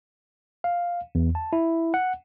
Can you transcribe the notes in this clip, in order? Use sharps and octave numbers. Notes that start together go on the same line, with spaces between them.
F5
E2
A5
E4
F#5